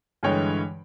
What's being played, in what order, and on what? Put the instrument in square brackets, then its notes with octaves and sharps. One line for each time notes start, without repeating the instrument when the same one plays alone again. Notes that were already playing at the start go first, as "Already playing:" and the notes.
[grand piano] G2 D3 E3 G#3 C#5 G5